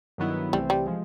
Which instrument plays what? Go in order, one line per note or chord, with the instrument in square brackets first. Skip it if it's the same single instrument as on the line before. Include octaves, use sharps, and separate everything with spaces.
[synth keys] G2 D#3 F#3 B3 E4
[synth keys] C2 C3 E3 A3 C4 [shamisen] G3
[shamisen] G3
[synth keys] F3 G#3